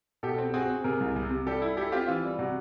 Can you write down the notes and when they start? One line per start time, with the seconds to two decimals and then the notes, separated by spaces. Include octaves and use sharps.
0.23 B2 G4 A4
0.38 C4
0.54 C4 F#4 G#4
0.70 C4
0.84 C3 G#4 A#4
1.00 C2
1.16 C3
1.31 C3
1.46 G3 G4 A4
1.62 E4
1.77 E4 G4 A4
1.92 C4 F4 G4
2.08 E3 F4
2.24 G3
2.39 C3 F#4